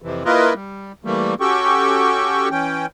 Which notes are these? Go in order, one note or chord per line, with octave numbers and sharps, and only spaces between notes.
F2 C3 E3
A#3 E4 F4 A#4 B4 D#5
G3
E3 G3 A3 A#3
C#4 F#4 G4 A4 G5 C#6
E3 C#4 G5